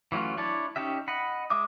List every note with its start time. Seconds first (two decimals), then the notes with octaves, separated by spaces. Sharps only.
0.12 E3 F#3 A3 C#4 F4
0.37 D4 E4 C#5 A5
0.76 C#4 D#4 G4 E5
1.08 D#5 F#5 B5
1.50 G#3 E5 D6 D#6